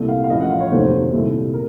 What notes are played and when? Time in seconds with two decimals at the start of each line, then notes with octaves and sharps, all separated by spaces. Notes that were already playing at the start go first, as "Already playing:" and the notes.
Already playing: C2 A#2 A3
0.09 F5
0.24 F5
0.29 A1 A2 F3 A3 D#5
0.40 F#5
0.50 F5
0.60 C#5
0.71 F1 D#2 D#3 F#3 A3 C5
1.12 C2 A#2 A3
1.54 A#4